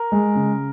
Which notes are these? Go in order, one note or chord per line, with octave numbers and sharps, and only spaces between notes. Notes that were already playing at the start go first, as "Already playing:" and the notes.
Already playing: A#4
G#3
C#3